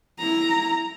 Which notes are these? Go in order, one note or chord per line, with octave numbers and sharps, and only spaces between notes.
E4 A#5